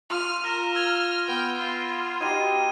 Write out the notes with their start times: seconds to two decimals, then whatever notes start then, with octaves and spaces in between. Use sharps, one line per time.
0.10 F4 F6 D#7 F7
0.44 A#4 F6 A#6 E7
0.75 E6 F6 G#6 G7
1.28 B3 G5
1.59 F4
2.21 D#4 F#4 G4 G#6 D#7